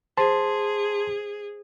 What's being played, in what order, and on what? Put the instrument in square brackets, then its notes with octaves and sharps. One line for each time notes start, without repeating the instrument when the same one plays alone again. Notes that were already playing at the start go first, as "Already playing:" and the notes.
[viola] G#4 [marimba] C5 [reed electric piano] A5 C6